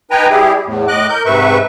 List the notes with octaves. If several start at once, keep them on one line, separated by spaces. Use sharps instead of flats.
D#4 B4 G5 G#5 A#5
G3 E4 G4 G#4
E2 A2
A2 D#5 D6 F#6
A#4 G6
G#2 C3 B4 E5 C#6